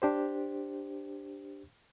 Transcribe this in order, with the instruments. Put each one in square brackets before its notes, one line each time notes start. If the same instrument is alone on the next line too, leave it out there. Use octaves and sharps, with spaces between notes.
[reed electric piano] D4 G4 C5